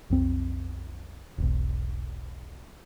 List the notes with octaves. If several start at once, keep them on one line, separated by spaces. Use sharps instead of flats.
B1 F2 C4
E1 B1